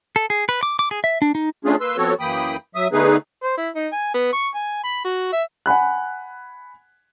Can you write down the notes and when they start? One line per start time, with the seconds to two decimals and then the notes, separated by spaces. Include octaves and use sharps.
0.16 A4
0.30 G#4
0.49 B4
0.63 D6
0.79 D6
0.91 G#4
1.04 E5
1.22 D4
1.35 D#4
1.65 A3 C#4 D4 F4 G#4
1.80 A#3 B4 C6 E6
1.97 F3 B3 C4 F#4 A4 C#5
2.20 F#2 E3 A#3 G5 B5 D#6
2.75 F#3 E5 D#6
2.92 D3 A3 B3 D#4 G#4 B4
3.44 C5
3.58 E4
3.76 D#4
3.93 G#5
4.14 B3
4.33 C#6
4.55 G#5
4.84 B5
5.05 F#4
5.33 E5
5.66 F#5 G#5 B5 F#6